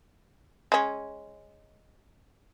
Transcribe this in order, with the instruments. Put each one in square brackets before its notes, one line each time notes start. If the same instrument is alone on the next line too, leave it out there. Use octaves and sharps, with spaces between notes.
[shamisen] G#3 C#4